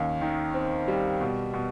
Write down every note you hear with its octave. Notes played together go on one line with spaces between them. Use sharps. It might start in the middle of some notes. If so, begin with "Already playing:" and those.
Already playing: D#2 C#4
D#3
C4
G3
B2
B2